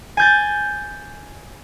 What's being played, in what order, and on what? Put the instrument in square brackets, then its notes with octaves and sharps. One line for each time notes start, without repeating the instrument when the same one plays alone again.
[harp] G#5 G6 A6